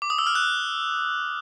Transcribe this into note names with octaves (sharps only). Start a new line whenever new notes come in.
D6
D#6
E6
F6
F#6